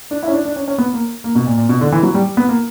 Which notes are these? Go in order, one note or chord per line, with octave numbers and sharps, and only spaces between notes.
D4
E4
C#4
D4
D4
C#4
C#4
B3
A#3
A#3
B2
A#2
A#2
B2
D3
E3
F#3
G3
B3
A#3